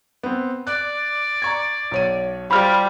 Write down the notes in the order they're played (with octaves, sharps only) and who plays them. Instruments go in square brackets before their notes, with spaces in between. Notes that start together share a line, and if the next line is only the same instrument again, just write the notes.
[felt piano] B3 C4
[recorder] D5 [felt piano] F#6
[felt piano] A#5 C#6 G#6
B1 C#5 D#7
[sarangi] G3 [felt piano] F4 C5 [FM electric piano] B5 F6